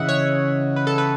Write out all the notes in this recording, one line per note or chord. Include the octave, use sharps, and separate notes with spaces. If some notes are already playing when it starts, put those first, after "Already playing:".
Already playing: C#3 E3 D#5 E5 F#5
C#5
B4
A4
B4